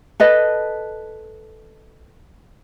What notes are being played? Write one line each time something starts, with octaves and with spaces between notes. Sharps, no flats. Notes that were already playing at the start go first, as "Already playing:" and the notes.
A4 B4 D#5